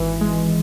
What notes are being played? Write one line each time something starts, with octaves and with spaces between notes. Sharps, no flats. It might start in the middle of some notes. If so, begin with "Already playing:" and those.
Already playing: G#1 E3
G#3